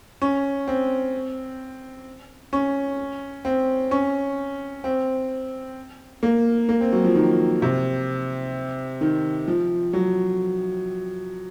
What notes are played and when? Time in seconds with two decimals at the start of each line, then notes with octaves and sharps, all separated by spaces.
0.22 C#4
0.68 C4
2.53 C#4
3.45 C4
3.91 C#4
4.84 C4
6.23 A#3
6.69 A#3
6.81 C4
6.92 F#3
7.04 F3
7.15 D#3
7.62 C3
9.01 D#3
9.48 F3
9.93 F#3